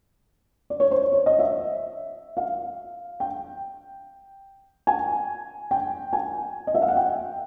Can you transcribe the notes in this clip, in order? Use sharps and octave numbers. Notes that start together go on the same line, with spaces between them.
D5
C#5
C5
C#5
D#5
E5
F5
G5
G#5
G5
G#5
D#5
E5
F5
F#5
G5